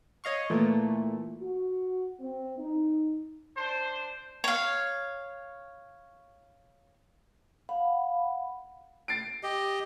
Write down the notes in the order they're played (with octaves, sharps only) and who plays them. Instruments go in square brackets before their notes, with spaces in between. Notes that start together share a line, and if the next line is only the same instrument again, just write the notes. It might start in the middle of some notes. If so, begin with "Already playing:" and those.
[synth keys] C#5 D#5 F5 C#6
A#2 E3 A3
[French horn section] F#4
C4
D#4
[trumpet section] D4 C5
[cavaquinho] C#5 F5
[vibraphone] F5 F#5 B5
[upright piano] A6 C7 D7
[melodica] G4 D#5